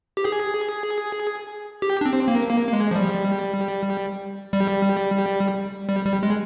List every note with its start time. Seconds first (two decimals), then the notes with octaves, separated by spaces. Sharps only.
0.17 G4
0.25 G#4
1.82 G4
2.01 D4
2.06 C4
2.28 A#3
2.50 A#3
2.67 A#3
2.73 G#3
2.91 F3
2.95 G3
4.53 G3
5.89 G3
6.05 G3
6.23 G#3